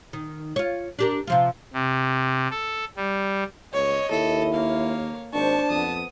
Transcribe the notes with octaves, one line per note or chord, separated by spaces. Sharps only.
D#3
F4 C#5
D4 G4 A#4
C3 F3 F4
C3
A4
G3
C#2 C#5 D#5
D#2 E4 A4
A#3 C#5 F5
G#1 D4 C5 A5 C#6
F2 B3 D#6